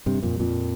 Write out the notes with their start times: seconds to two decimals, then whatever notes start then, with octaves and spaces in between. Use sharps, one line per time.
0.06 G2 C3
0.23 F2 A#2
0.39 F2 A#2